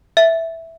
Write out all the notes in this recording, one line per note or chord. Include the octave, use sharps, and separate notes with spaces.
E5